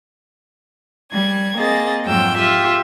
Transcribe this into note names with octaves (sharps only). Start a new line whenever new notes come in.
G3 G#6
A#3 C4 G#4 D#5 A6
F2 G#2 F#3 F4 G5 E6
F4 G4 E5